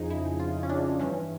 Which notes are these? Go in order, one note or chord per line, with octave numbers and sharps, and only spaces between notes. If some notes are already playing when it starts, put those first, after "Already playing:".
Already playing: F2 C#3 F3 D#4 G#4
E4
F4
C#4
D4
G2 E3 C#4